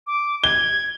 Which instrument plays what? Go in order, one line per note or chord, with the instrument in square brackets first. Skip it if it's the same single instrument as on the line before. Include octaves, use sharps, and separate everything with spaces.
[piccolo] D6
[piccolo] G#6 [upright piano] G7